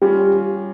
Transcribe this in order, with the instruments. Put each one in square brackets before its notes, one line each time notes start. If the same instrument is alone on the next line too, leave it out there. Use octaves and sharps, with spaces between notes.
[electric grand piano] G3 C#4 F4 [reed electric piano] G4